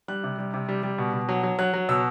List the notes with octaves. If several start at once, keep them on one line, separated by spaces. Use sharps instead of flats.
G3 F#6
C3
G3
C3
G3
G3
B2
B2
F#3
F#3
F#3 F#6
F#3
B2 E6